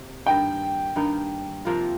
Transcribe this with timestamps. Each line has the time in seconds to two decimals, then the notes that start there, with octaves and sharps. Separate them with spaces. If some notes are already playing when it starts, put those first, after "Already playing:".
Already playing: C3 A#3
0.26 G2 D#3 A#3 D#4 G5
0.96 G2 D#3 A#3 D#4
1.65 C3 F3 A#3 F4